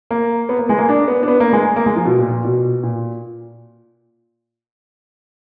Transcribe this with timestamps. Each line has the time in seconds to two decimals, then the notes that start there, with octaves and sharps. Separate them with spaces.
0.11 A#3
0.49 B3
0.59 A#3
0.69 G#3
0.78 A#3
0.89 D4
1.08 B3
1.23 D4
1.28 B3
1.40 A#3
1.53 G#3
1.76 A#3
1.86 G#3
1.96 F3
2.05 B2
2.18 A#2
2.31 A#2
2.44 B2
2.83 A#2